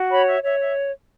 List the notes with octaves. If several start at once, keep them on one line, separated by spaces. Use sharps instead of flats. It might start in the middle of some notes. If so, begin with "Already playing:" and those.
Already playing: F#4
C#5 B5
E5
C#5 E5
E5